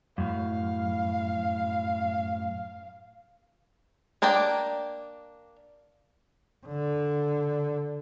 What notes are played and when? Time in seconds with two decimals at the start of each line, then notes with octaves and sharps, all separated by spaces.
0.18 F#2 A2 F5
4.22 A#3 D4 A#4 D5 G5
6.66 D3